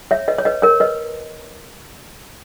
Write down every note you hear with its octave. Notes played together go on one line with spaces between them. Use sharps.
C#5 E5
B4 D#5
C#5
B4 D#5
A#4 C#5
B4 D#5